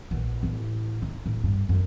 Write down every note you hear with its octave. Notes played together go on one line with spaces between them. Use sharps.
A#1 B3
A1 E4
D#4
A2
G2
F#2